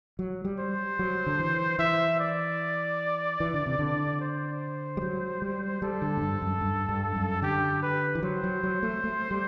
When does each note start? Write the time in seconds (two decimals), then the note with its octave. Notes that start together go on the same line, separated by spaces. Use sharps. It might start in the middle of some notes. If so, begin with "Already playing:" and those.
0.19 F#3
0.45 G3
0.59 C5
0.99 F#3
1.26 D3
1.39 E3
1.79 E3 E5
2.19 D5
3.40 E3
3.54 D3
3.66 C3
3.79 D3
4.20 C5
4.97 G3
5.02 F#3
5.42 G3
5.82 G3 A4
6.02 D3
6.17 A2
6.22 G2
6.42 F#2
6.61 G2
6.89 G2
7.16 F#2
7.42 D3 G4
7.82 B4
8.15 E3
8.23 F#3 C5
8.44 F#3
8.63 F#3
8.83 A3
9.04 A3
9.31 G3